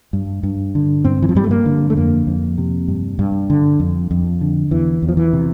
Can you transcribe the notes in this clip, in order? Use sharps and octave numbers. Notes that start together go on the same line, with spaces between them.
G2
G2
D3
G2 C4
E3
F3
G2 G3
A3
A#3
D3
A3
F2 A#3
F2
C3
G2
G2
D3
F2
F2
D3
E2 E3
E2
F3
E3
C3